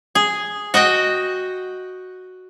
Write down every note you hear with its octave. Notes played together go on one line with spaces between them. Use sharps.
G#4
F#4 D#5 F#5 G5